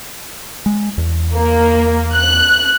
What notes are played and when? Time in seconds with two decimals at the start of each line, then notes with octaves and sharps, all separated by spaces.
0.66 G#3
0.98 E2
1.36 A#3
2.16 F#6